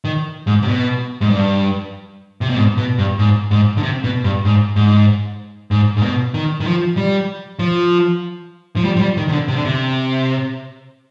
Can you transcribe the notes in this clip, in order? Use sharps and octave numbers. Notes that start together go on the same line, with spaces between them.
D#3
G#2
C3
B2
G#2
G2
C3
B2
G#2
B2
G2
G#2
G#2
D3
C3
B2
G2
G#2
G#2
G#2
G#2
B2
D#3
D#3
F3
G3
F3
F3
G3
F3
G3
D#3
C3
D3
C3
D3
C3